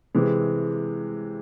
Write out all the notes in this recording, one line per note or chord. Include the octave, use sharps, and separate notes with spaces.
C3 E3 G#3